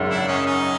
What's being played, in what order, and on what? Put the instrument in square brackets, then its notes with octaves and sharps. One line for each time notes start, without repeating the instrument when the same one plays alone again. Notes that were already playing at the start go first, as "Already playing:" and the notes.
Already playing: [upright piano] G#1 F#2 C#3
[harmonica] D4 E4
C#4 D#4
C#4 D#4